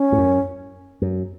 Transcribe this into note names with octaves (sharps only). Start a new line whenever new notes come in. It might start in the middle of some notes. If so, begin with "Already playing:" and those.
Already playing: C#4
A2
F#2
F#2